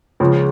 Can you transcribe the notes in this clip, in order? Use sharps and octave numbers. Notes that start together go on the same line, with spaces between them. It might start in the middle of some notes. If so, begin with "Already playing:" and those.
C#2 C#3 F3